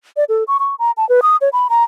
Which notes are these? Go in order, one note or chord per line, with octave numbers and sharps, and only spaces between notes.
D5
A4
C#6
C#6
A#5
A5
B4
D#6
C#5
B5
A#5